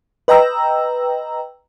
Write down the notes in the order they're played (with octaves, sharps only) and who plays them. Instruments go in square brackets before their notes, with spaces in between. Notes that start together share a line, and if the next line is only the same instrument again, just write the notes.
[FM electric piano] B4 D#5 G5 A#5 E6